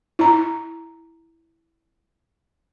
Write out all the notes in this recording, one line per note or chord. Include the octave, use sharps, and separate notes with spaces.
E4 A#5